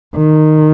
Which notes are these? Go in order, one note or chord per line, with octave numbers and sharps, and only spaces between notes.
D#3